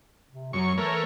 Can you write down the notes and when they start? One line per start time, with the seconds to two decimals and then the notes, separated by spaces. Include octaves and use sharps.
0.30 C3
0.53 F#2 F#3 C#6
0.78 E3 A3 A#4 C#5